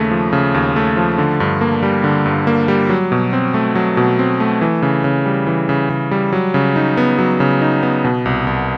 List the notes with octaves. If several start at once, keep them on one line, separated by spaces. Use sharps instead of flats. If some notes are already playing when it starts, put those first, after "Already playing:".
Already playing: D#2 C#3 A3
F3
C#3
D#2
A3
F3
D3
G2
A#3
G3
D3
G2
A#3
G3
F#3
B2
C4
A3
F#3
B2
C4
A3
E3
C#3
C#3
G3
E3
C#3
C#3
G3
F#3
C#3
D#4
B3
F#3
C#3
D#4
B3
B2
C2
C2